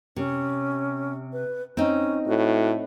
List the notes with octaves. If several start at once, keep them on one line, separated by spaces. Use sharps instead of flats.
C3 C#4
B4
C4 C#4 D#4
A2 F#4